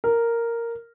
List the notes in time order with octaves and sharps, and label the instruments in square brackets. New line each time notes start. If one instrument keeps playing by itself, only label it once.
[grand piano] A#4